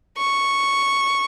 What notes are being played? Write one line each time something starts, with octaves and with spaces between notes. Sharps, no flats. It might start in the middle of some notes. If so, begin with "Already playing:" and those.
C#6